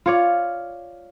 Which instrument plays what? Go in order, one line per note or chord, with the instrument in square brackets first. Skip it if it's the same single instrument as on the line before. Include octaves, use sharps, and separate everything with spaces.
[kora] F4 C#5 D5